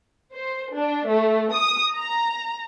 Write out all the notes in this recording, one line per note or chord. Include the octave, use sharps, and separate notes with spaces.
C5
D4
A3
D#6
A#5